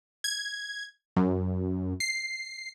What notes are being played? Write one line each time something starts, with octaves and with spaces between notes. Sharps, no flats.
G#6
F#2
C7